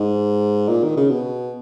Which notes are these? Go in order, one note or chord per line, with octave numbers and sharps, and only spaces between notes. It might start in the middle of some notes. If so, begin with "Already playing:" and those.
Already playing: G#2
A#2
D#3
C#3
B2